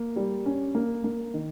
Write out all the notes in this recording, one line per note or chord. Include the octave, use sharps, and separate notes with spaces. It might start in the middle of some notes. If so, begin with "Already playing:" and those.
Already playing: A#3
G3
C#4
A#3
A#3
D#3